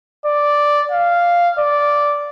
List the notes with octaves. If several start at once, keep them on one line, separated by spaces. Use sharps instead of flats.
D5
F5
D5